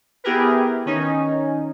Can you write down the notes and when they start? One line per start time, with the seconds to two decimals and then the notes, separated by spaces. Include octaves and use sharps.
0.24 B3 E4 G4 G#4 A#4 B4
0.86 D#3 C#4 D#4